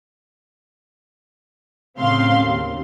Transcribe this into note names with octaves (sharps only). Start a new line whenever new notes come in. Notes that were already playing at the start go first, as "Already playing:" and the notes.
A2 C#3 C4 F5 C6
D#2